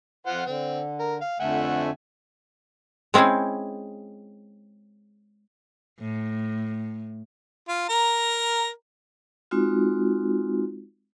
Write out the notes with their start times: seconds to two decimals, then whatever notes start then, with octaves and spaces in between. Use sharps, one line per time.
0.26 F2 F4 C5 F#5
0.46 D3 C4
1.00 A#4
1.21 F5
1.40 F2 D3 A3 E5 F#5 G#5
3.14 G#3 C4 C#4 E4 G#4
6.00 A2
7.68 F4
7.89 A#4 A#5
9.51 G#3 C4 D#4 F4 F#4